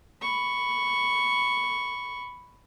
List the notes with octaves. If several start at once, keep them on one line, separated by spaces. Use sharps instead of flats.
B5 C#6